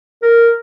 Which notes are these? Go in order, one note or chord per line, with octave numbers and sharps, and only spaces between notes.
A#4